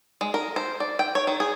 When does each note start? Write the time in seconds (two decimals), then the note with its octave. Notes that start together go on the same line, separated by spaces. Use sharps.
0.21 G#3
0.34 A#4
0.56 C5
0.80 D5
0.99 G5
1.15 C#5
1.27 D#3
1.40 G#4